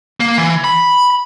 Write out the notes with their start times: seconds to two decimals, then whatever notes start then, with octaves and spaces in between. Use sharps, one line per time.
0.20 A#3
0.38 E3
0.64 B5